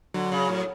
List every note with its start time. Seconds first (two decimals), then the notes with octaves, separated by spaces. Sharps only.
0.14 D3 F#3
0.32 C#3
0.49 A2